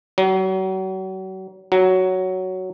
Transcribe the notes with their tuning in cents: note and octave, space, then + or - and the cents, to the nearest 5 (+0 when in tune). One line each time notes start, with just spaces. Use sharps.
F#3 +35
F#3 +5